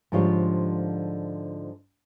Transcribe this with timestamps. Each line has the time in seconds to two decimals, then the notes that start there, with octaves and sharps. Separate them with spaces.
0.12 G#2 D3 F3 G3 F4 C#5